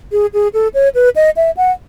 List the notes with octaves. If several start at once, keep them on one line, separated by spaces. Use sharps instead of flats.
G#4
G#4
A4
C#5
B4
D#5
E5
F#5